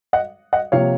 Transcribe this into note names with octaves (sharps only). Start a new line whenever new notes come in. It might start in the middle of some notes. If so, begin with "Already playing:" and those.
D#5 F#5
D#5 F#5
C3 F3 A#3 C#5 F5